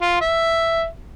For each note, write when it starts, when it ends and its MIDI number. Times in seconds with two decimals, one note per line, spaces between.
0.01 0.19 65
0.21 0.85 76